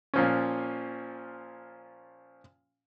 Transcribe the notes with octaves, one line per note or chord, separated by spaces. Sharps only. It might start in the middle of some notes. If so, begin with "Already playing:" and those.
A#2 F3 C#4